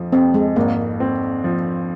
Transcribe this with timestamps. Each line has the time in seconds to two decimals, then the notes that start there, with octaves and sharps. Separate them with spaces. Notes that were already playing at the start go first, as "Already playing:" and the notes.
Already playing: F2 F3
0.12 F2 C4
0.34 G#3
0.56 G#1 A#3
1.00 C4
1.44 F3